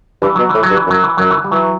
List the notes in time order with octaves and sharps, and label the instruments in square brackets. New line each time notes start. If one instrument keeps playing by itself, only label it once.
[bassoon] G2 [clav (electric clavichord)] E3
[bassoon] B2 [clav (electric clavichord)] F#3
[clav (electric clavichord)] E3
[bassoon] A2
[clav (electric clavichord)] F#3
[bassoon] G2
[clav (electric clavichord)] E3
[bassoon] F#2 [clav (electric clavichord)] F#3
[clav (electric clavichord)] E3
[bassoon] F#2 [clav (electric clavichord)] F#3
[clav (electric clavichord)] E3
G3
[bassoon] E3 [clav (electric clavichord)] F#3